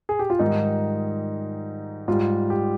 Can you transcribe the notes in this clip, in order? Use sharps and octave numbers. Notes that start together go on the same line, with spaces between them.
G#4
G4
F4
G#2 D#3 G3 D#4
G#2 G3 F4
G4